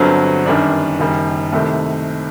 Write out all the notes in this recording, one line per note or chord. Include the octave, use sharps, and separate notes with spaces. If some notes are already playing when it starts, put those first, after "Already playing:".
Already playing: G1 G2 D3 F#3 C4
G1 F#2 D#3 G3 D4
F#1 F#2 D#3 G3
C2 C3 D#3 A3